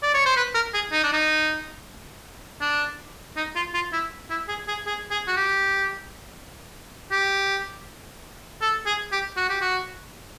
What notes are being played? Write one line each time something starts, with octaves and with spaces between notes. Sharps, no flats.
D5
C#5
C5
B4
A#4
G#4
D#4
D4
D#4
D4
D#4
F4
F4
E4
E4
G#4
G#4
G#4
G#4
F#4
G4
G4
A4
G#4
G4
F#4
G4
F#4